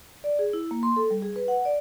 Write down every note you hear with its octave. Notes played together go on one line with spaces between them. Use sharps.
D5
G#4
E4
A#3
C6
A4
G3
G#4
B4
F#5
D5